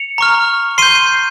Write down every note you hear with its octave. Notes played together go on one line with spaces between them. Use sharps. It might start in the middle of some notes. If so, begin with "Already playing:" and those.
Already playing: C#7 F7
A#5 C#6 F6
C6 G6 C7 D#7